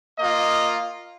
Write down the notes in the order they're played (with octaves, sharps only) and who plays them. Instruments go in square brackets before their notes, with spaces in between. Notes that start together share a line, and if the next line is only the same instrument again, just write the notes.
[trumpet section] A#3 F4 D#5